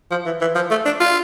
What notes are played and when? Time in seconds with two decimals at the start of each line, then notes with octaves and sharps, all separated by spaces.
0.11 F3
0.26 E3
0.41 E3
0.55 F3
0.70 A3
0.85 D4
1.00 F4